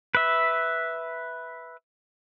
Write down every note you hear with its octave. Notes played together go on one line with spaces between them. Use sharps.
B4 E5